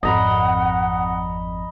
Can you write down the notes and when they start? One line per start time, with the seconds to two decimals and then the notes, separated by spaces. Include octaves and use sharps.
0.03 G#1 F2 D#5 F#5 A#5 B5